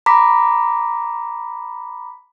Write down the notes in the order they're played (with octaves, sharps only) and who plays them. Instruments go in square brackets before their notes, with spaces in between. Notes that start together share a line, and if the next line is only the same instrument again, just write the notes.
[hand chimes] A#5 B5 D6 B6